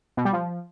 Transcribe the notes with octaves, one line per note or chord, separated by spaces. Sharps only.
B2
G3
F3